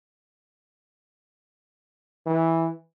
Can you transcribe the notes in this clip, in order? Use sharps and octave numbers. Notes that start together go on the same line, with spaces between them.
E3